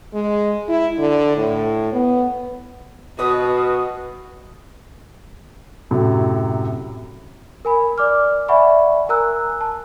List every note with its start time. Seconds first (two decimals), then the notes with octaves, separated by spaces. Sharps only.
0.14 G#3
0.68 E4
0.98 D3
1.37 A2
1.93 B3
3.19 B2 F#4 B4 D#5
5.91 F#2 A2 C3 F#3
7.65 A#4 G#5 B5
7.98 D5 D6 F6
8.48 D5 E5 F#5 G#5 B5 C#6
9.09 A#4 G#5 A#5 E6 F#6
9.61 A5